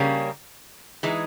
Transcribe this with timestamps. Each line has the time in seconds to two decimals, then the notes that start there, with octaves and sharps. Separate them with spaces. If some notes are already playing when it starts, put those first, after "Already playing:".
Already playing: C#3 G3 A#3 C#4
1.03 E3 G#3 D#4